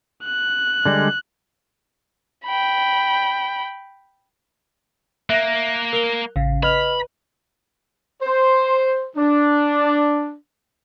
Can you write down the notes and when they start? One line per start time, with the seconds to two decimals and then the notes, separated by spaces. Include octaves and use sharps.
0.24 F#6
0.85 D3 G3 G#3
2.45 G5 B5
5.30 A#3 E5 F#6 A#6
5.93 A#4 F7 G7
6.36 A1 C#3 F5
6.63 B4 D#5 B5 F6 F7
8.22 C5
9.18 D4